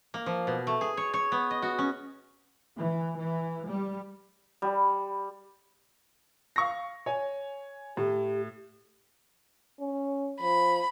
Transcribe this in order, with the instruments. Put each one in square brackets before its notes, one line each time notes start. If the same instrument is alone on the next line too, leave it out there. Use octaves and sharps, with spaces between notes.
[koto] A#3
F3
B2
A3
G#4
C#5
C#5
B3
D#5
F#4
C#4
[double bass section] E3
E3
G3
[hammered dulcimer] G3
[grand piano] F5 C#6 A#6
C#5 G#5
[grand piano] A2 [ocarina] G4
[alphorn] C#4
[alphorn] F3 [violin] B5